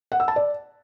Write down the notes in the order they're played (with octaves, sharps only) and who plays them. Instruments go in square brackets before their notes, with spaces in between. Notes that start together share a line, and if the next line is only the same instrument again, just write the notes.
[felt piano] F#5
E6
A5
D5